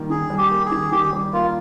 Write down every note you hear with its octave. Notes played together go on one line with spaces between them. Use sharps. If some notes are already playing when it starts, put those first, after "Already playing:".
Already playing: D#3 G3 A#3
D#3 G#4
G3
G4
A#3
G#4
D#3
D#3 G4
G3
A#3 F4